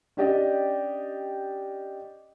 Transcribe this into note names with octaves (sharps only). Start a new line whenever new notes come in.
C#4 D4 G4 D5 D#5 G5